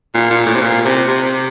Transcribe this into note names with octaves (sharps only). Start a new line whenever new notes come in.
A#2
A#2
A2
C3
A#2
C3
C3